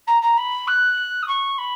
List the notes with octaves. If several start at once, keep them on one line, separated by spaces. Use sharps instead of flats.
A#5
A#5
B5
F#6
D#6
C#6
B5